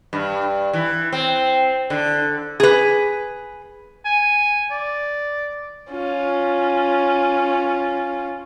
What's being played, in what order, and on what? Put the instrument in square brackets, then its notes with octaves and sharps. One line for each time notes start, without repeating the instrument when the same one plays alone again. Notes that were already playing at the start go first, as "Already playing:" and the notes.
[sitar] G2
E3
C4
D3
[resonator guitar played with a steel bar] G#4 B4
[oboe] G#5
D5
[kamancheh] C#4 F4